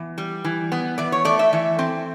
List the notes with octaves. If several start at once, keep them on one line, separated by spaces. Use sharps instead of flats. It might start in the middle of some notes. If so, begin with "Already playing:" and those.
Already playing: E3 B3
G3
E3
B3
E3 D5
C#5
A3 D5
E5
E3
C4